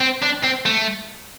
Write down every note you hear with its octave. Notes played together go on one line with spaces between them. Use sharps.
C4
D4
C4
A3